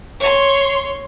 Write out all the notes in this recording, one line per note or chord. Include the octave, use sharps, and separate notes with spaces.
C#5 C6